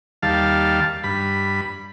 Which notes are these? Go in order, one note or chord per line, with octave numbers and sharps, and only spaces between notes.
D#2 G3 F5 A5
G2 B5